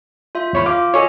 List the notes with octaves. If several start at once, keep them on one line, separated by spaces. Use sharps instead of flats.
F4 E5
E2 C#5 B5
F4 F5 D6
F#4 A4 C#5 D#5 G#5